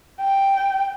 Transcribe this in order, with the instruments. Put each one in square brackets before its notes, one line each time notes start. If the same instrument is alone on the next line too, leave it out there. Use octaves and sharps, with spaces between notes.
[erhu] G5